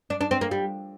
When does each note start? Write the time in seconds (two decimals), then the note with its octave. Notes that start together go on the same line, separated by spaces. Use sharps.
0.10 D4
0.21 D4
0.31 C4
0.41 A#3
0.51 G3